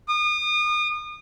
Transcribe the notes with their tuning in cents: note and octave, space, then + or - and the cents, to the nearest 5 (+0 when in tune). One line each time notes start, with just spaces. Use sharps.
D#6 -35